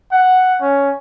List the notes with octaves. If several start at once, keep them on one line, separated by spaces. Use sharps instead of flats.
F#5
C#4